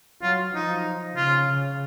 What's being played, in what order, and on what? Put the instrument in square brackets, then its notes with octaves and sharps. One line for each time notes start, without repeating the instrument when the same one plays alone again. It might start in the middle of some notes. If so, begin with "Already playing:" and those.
[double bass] F#3 [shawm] F4
[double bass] F3 [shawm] D#4
[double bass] C#3 [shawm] F4
[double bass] C#3